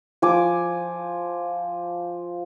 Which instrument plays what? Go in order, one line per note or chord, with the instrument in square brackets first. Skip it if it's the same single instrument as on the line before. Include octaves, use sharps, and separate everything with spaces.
[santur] F3 G#5 D6